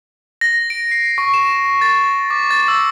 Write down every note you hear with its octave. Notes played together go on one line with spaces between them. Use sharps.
A#6
D7
C7
C#6
E7
A6
D6
A6
E6